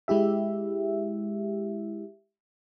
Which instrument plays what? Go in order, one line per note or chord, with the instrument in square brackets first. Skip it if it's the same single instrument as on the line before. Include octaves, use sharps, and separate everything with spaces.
[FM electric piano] G#3 E4 G4 E5